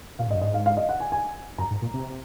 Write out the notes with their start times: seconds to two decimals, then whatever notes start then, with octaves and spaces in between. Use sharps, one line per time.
0.19 A#2 F5
0.27 G#2
0.31 D#5
0.35 F#2
0.41 G#2 D#5
0.54 F5
0.66 F5
0.77 D#5
0.89 F#5
1.00 G#5
1.12 G#5
1.58 F#2 A#5
1.71 G#2
1.82 A#2
1.94 C3